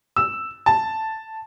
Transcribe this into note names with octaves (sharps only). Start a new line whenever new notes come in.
E6
A5